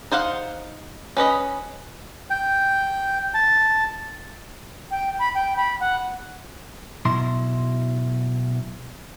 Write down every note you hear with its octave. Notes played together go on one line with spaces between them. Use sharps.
D#4 C5 F5 F#5
C#4 B4 D#5 B5
G5
A5
G5
B5
G5
B5
F#5
B2 F#3 E4 C6